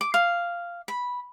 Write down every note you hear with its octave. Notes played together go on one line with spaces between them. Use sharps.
D6
F5
B5